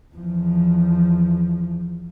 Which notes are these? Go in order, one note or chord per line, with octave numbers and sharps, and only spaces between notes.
E2 F3